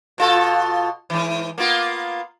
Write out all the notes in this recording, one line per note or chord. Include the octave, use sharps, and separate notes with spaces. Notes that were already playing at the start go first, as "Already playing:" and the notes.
B2 F4 A4
G#2 E3
A#3 B3 F4